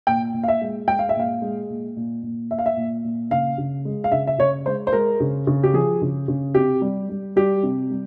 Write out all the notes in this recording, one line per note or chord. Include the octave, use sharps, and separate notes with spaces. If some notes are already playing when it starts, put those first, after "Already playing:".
A#2 G5
A#2
F5
E5
G#3
G#3 G5
F5
E5
A#2 F5
G#3
A#2
A#2
A#2
A#2 E5
F5
E5
A#2
A#2
C#3 F5
C#3
G#3
F5
C#3 E5
E5
C#3 C#5
G#3 C5
C5
G#3 A#4
C#3
C#3
G4
F3 G#4
C#3
C#3
C3 G4
G3
G3
G3 G4
C3
G3